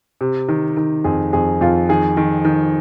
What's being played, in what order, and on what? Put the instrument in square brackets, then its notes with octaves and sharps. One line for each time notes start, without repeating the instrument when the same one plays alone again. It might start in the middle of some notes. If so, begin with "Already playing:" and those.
[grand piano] C3
D#3
D#3
F2 G#4
F2 G#4
F2 F4
D#3 G#4
D#3
D#3